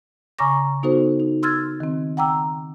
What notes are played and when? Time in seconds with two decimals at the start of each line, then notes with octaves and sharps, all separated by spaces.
0.39 C#3 G#5 A#5 C#6 D6 A#6
0.83 B3 D#4 F#4 A4 C5
1.20 D#4
1.43 C6 E6 F6 G#6 A6
1.80 D#3 C4
2.17 F#5 G5 A#5 D6 E6